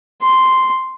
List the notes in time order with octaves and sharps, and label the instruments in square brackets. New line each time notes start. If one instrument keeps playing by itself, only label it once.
[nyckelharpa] C6